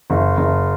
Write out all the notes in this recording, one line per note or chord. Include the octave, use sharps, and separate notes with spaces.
F#1
F#1